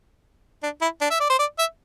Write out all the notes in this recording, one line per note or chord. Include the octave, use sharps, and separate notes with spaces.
D4
E4
D4
E5
D5
C5
D5
E5